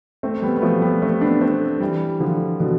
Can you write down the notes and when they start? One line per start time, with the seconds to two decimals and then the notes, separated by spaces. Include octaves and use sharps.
0.23 A3 C4
0.42 G3 B3
0.57 B3
0.62 F3 A3
0.82 G3 B3
1.02 A3 C4
1.21 B3 D4
1.41 A3 C4
1.80 E3 G3
2.20 D3 F3
2.60 B2 D3